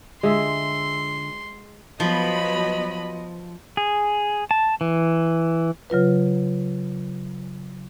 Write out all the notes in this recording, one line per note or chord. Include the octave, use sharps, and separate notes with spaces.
D3 G#3 F4 E5 C6
F3 F#3 B3 D#5 B5
G#4
A5
E3
C#3 F#3 F4 B4